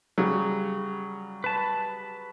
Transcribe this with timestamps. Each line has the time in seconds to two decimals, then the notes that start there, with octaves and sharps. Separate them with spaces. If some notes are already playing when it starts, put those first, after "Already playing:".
0.18 C#3 F#3 G3
1.44 B4 A5